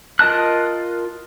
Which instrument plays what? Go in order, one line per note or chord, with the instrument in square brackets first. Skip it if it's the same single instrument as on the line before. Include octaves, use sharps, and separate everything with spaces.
[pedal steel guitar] F4 A#4 D#5 A5 F#6